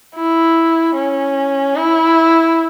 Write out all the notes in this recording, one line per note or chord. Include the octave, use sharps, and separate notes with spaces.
E4
C#4
E4